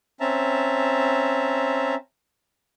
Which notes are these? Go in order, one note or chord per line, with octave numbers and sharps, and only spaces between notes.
C4 C#4 E5 A5 A#5